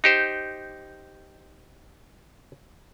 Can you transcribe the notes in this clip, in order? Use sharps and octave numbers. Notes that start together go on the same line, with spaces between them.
D#4 G4 C5